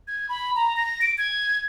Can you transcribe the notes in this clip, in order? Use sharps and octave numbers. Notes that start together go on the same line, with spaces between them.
G#6
B5
A#5
A#6
D7
G#6